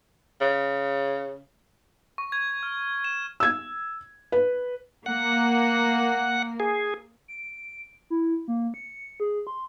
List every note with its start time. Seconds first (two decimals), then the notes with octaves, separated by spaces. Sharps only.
0.41 C#3
2.18 C#6
2.32 G#6
2.63 F6
3.04 E7
3.40 E6 G#6
4.32 B4
5.06 A#3 F#5
6.60 G#4
7.28 D7
8.10 E4
8.48 A#3
8.74 C#7
9.20 G#4
9.47 C6